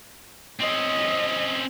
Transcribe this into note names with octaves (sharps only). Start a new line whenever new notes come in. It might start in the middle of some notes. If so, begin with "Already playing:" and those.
C4 C#4 D#5